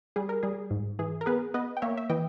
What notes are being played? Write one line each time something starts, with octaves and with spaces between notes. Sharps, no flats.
G3 G#4
A#4
G3 G#4
G#2
E3 G#4
A#4
B3 G#4 B4
B3 B4 D#5
G5
A#3 C#5 E5
E5
E3 D#5 G5